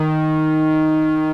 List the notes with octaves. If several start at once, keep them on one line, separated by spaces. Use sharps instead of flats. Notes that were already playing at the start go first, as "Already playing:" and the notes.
Already playing: D#3